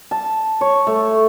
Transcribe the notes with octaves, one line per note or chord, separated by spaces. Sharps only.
A5
C#5
A3